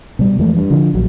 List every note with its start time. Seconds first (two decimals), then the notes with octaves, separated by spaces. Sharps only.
0.19 B2 G3
0.39 F2 E3 G#3 A3
0.57 G2
0.70 D3 F3
0.94 A#1 F#3